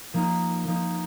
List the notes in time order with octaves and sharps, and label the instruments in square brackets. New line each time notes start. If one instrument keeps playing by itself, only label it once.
[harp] F3 A#3 D#4
F3 A#3 D#4